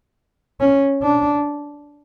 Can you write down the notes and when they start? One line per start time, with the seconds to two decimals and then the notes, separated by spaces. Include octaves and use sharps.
0.60 C#4
1.02 D4